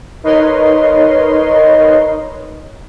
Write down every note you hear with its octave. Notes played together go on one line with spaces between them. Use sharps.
D#4 A#4 B4 C#5 D#5 C6